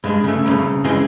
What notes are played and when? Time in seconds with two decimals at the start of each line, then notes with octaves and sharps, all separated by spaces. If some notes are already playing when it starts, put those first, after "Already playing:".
0.04 G2 G#3 D4
0.24 C#3 A3
0.46 C2 G2 C#3
0.84 C#3 E3 G#3 C4